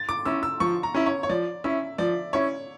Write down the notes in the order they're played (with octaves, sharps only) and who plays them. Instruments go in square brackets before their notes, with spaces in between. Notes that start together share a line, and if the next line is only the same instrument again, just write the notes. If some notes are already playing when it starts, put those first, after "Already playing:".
Already playing: [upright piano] A6
D6
[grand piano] C#4 E4 [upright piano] E6
[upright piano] E6
[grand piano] F3 [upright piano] C#6
[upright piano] A#5
[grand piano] C#4 E4
[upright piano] C#5
C#5
[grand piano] F3 [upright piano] D5
[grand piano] C#4 E4 [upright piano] E5
[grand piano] F3 [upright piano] D5
[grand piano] C#4 E4 [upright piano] C#5